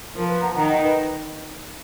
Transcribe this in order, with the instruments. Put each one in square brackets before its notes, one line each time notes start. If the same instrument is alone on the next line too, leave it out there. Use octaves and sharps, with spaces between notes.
[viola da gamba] F3 [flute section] A#4
[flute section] B4
F#5 A#5
[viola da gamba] D#3 [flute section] F#5 A#5
[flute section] D#5 F#5
B4 D#5